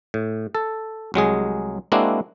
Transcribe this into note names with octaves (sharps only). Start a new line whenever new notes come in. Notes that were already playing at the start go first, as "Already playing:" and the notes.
A2
A4
C2 F#3 G#3 G#4
G#3 A#3 C4 D4 E4 F#4